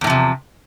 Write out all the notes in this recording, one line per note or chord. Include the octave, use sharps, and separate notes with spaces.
E2 A2 C3 F3